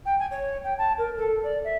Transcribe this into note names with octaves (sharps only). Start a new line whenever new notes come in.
G5
G#5
C#5
G5
A5
A#4
A4
D5
E5